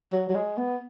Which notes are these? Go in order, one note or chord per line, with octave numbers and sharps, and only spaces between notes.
F#3
F#3
G#3
B3